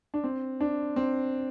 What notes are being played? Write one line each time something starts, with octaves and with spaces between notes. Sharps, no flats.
D4
C4
D4
C4